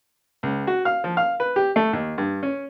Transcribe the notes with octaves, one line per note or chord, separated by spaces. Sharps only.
C#2
F#4
F5
F3
F5
B4
G4
A3
D#2
G2
C#4